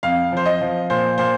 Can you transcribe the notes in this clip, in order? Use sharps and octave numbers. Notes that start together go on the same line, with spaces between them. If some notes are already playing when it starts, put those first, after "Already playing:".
F2 F5
F3 C5
D#5
F3
A#2 C5
A#2 C5